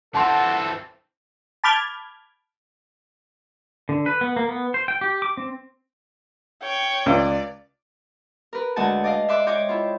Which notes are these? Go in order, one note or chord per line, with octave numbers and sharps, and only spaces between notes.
E3 C4 A4 F#5 A5 C6
A5 B5 D6 F6 G6 G#6
D3
B4
B3
A#3
B3
C5
G5
G4
D6
C4
C#5 G5
C#2 D5
A#4 B4
D2 G#3 F#4 F#5 G#5 A5
D5 D#5 F5
E5 C6 D6 F#6
C5 C#5 D#5 G5 D6
E4 F4